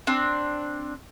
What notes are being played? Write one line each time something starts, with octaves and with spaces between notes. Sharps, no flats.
C4 D4